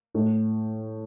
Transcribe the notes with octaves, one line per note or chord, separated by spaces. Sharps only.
A2